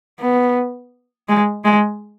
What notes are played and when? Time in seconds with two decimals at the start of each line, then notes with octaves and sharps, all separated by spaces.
0.20 B3
1.28 G#3
1.65 G#3